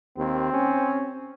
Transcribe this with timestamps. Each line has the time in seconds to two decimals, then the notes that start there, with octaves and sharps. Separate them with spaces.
0.18 D#2 C4
0.53 C#4